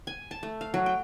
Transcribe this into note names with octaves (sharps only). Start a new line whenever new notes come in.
G#5
A5
A3
F5
F#3
G5